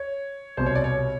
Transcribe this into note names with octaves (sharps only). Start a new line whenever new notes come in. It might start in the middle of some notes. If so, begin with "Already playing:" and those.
Already playing: C#5
C2 B2 C5
C#5
D5
C#5